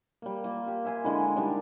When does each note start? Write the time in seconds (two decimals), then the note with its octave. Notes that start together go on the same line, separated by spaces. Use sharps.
0.22 G3 A#3
0.44 A#3 F4
0.67 G4
0.85 E5 G#5 C6
1.04 D3 G#3 E4
1.36 D#3 G3 D4 D#4